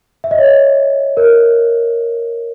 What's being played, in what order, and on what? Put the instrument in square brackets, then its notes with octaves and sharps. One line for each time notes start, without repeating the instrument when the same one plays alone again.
[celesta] E5
D#5
C#5
D#5
A#4